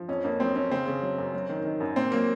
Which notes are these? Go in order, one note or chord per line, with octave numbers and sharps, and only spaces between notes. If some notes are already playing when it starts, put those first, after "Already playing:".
Already playing: F3
F2 C#4
F2 A#3
F#3 C4
F2 C#4
C#3 C4
C#3
F#3
F#2
F#3
D#3
D#3
F#2
A#2 C4
F#3 A#3